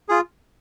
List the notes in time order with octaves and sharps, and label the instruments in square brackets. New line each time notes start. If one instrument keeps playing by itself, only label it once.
[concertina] F4 G#4